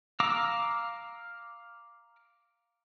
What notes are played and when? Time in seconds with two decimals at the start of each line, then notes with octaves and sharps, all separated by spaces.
0.20 F5 A#5 D6 E6